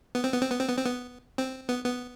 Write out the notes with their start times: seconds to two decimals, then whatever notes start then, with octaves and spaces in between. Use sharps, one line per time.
0.15 B3
0.24 C4
0.33 B3
0.41 C4
0.51 B3
0.60 C4
0.68 B3
0.77 C4
0.85 B3
1.38 C4
1.69 B3
1.85 B3